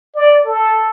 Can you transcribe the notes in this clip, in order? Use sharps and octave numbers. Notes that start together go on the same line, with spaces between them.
D5
A4